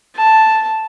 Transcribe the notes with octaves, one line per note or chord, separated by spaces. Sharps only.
A5